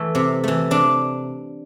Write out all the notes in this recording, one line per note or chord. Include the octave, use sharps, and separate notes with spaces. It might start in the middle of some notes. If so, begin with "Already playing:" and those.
Already playing: E3 A3
C3
E3 A3
C3 D4